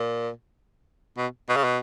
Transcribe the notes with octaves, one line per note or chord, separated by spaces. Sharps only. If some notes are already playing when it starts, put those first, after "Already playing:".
Already playing: A#2
B2
B2
C#3
B2